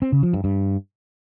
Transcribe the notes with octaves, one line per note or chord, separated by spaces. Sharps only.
C4
C#3
F3
G2
G2